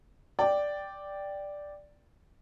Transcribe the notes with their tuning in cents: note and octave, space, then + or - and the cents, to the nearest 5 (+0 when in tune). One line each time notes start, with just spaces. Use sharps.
D5 +0 G5 +0